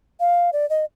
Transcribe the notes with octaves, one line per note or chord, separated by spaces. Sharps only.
F5
D5
D#5